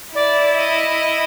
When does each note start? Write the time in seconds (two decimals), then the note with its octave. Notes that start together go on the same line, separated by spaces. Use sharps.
0.15 E4 D5
0.52 E5
0.57 D#5